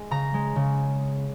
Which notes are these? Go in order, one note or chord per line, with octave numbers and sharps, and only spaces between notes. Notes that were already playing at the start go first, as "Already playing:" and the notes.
Already playing: G#3
C#3 A#5
G#3
C#3